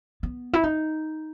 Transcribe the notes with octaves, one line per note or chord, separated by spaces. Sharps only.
B3
E4
D#4